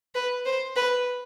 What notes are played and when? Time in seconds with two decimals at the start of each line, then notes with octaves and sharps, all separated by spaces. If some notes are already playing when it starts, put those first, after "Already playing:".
0.15 B4
0.46 C5
0.76 B4